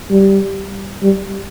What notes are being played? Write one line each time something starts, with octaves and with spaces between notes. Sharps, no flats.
G3
G3